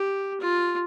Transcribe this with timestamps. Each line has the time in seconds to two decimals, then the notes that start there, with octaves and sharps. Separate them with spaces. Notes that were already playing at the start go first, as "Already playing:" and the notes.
Already playing: G4
0.40 F4